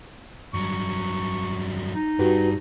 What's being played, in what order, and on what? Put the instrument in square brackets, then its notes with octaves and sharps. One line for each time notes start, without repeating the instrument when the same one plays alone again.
[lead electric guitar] G2 F#3 [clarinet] C#6
[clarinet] D#4
[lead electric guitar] G2 [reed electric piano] F#4 G4 B4